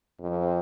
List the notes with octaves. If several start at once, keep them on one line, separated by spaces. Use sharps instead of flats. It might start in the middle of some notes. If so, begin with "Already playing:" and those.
F2